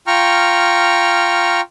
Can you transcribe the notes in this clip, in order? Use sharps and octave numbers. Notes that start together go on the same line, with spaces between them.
F4 G5 A#5 C#6 F6